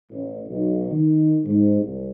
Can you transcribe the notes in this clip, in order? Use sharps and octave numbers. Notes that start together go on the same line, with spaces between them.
A1
B1
D#3
G#2
C2